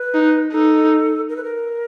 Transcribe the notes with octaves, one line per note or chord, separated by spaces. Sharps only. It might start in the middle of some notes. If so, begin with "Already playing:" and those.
Already playing: B4
D#4
D#4 A4
A#4
B4
A#4